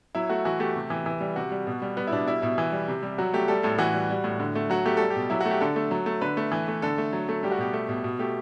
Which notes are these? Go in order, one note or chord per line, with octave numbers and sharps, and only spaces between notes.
F#3 E4
A3 F#4
E3 F#4
A3 G4
C3
E3
E3
G3
C3 F#4
G3
B2
G3
G3 B3
E4
B2 D4
G3 E4
B2 E4
E3
G3
C3
G3
F#3 F#4
A3 G4
G3 A4
A2 A4
E3 F#4
G3
G3
A2
D3
A3
F#3 F#4
A3 G4
G3 A4
G4
B2
F#3 E4
A3 F#4
G4
D3 A4
A3
F#3
A3
D3 B4
A3
E3
A3
D3 A4
A3
F#3
A3
G3 G4
F#4
B2 G4
A3
B2
B2
A3 G4